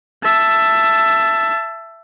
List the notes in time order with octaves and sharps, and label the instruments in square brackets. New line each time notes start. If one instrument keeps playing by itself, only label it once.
[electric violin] E5 A5